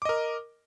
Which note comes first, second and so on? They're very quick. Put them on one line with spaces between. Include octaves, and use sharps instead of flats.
D6 D#5 A#4